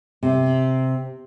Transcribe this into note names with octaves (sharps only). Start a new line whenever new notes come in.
C3